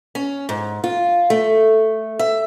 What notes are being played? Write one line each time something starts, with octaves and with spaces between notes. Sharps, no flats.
C#4
G#2
F4
A3
E5